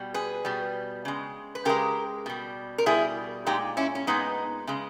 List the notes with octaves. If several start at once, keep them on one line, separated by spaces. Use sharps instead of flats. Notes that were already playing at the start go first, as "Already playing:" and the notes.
Already playing: B2 G3
G#4 B4
B2 G3
C#3 G#3
B4
C#3 G#3 G4 A#4
B2 G3
A#4
B2 G3 E4 G#4
A#2 G#3 D#4 G4
C#4 E4
C#4
A#2 G#3 B3 D#4
C#3 G#3